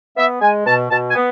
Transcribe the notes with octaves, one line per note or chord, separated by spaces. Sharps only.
B3 E5
G#3 G#5
B2 A5
B2 A5
G#5
B3